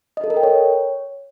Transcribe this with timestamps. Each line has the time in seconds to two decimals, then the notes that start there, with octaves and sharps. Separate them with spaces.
0.17 D#5
0.24 A4
0.30 A#4
0.37 G5
0.43 C#5